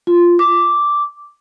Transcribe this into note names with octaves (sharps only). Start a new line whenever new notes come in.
F4
D6